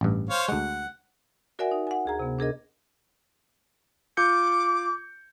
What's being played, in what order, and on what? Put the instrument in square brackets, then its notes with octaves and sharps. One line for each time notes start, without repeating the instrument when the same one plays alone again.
[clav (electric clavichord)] A1 G2
[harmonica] C5 C#5 F5
[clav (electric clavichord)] D2 G#3 [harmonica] F#5
[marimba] F#4 A#4 D5 E5 F#5 G#5
D#4
F#5 G#5
D2 G#4 A#5
C3 B3
D4 G#4 A#4 D#5
[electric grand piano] F4 G6 C#7 [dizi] D6